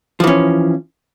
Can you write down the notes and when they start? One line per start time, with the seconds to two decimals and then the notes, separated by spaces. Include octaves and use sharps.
0.20 F3
0.24 E3
0.27 C#4